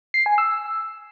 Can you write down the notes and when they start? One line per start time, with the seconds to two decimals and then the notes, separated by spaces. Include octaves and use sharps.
0.14 C7
0.26 G#5
0.38 E6